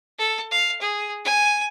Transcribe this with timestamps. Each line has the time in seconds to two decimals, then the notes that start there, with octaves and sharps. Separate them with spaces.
0.19 A4
0.51 F5
0.81 G#4
1.25 G#5